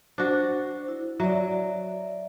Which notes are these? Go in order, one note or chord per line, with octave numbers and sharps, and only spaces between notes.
D4 F#4 C5
E4
F#3 D5 E5